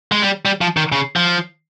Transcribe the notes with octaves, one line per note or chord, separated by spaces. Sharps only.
G#3
G3
G3
F3
D#3
C#3
F3